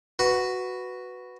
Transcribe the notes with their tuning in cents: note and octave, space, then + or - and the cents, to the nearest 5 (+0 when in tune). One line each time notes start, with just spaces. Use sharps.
F#4 +0 B4 +0